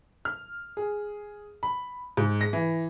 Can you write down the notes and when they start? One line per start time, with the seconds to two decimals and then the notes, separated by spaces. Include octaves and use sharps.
0.25 F6
0.77 G#4
1.63 B5
2.17 G#2
2.41 A#6
2.53 E3